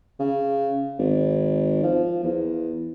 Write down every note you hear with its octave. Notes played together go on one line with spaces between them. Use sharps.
C#3
G#1
F3
E2